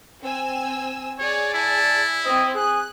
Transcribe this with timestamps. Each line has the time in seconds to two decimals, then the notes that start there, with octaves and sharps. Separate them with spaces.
0.21 C4 G#5 E6
1.19 G#4 C#5 D5
1.54 E4 A5
2.25 C4 D#5
2.55 G#4 F#6